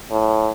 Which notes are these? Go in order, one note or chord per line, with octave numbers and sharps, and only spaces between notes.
A2